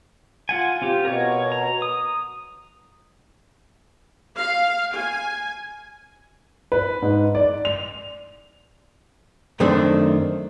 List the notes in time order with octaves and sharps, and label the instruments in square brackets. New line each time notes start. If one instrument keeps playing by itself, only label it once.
[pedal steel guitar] F4 F#5 G#5
C4 F4 G4
[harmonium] B2 [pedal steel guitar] A#4 C#5
[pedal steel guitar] A#5
D#6
[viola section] F5
G#5
[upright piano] B4
G#2
D5
F7
[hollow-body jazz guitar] F#2 D#3 A3 C4 D4